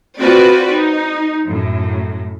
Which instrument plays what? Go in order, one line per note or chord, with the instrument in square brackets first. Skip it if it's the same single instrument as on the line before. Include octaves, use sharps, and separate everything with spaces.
[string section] C4 F4 F#4 B4 D5
D#4
F#2 A2